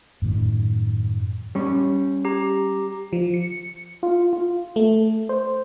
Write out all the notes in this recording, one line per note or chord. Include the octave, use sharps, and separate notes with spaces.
F#2 A2 D#3
G3 C#4
G4 A#5
F3
C#7
F4
F4
A3
C5